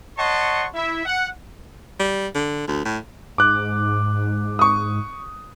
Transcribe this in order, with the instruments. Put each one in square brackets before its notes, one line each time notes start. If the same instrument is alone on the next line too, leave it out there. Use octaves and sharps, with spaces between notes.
[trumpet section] C#5 D#5 F#5 A5 C6 C#6
E4 E5
F#5
[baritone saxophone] G3
D3
D2
A2
[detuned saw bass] G#2 [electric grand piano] D6 F#6
[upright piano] C#6 D#6